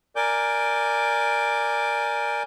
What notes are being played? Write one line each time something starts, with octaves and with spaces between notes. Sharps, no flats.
A#4 D5 G#5 D6 G6